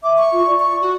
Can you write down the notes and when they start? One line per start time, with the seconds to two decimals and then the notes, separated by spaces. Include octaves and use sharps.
0.03 E5 D6
0.18 C#6
0.32 F4
0.46 D5
0.60 C#6
0.82 F#4